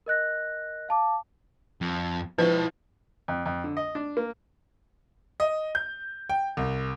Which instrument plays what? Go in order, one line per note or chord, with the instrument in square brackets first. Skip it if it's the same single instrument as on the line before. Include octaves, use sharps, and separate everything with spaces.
[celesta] A#4 D#5 F#6 A#6
F5 A5 D6
[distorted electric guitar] F2
[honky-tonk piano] F3 [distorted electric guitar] E4 G5 [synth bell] B4
[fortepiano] F2
F2
D3
D#5
D4
A#3
[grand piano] D#5
G6
G5
C2